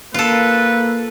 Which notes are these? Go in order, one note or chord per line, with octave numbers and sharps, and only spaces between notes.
A#3 F4 A4 B4